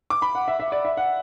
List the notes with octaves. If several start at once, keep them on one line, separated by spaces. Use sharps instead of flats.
D6
B5
F#5
E5
E5
D5
E5
F#5